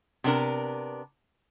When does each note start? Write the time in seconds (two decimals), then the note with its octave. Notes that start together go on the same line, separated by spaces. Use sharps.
0.24 C3 B3 D4 A#4